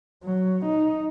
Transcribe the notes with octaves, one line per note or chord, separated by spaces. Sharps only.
F#3
D#4